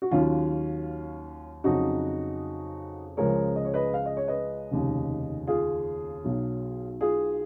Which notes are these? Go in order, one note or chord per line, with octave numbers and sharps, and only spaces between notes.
F#4
D#2 D#3 F#3 C#4 F4
F2 C#3 F#3 D#4 F#4
C#2 C#3 F3 G#3 A#4 C#5
D#5
C#5
B4 D#5
F5
D#5
C#5
B4 D#5
F1 D#2 C#3
F4 G#4
B1 B2 F#3
F4 G#4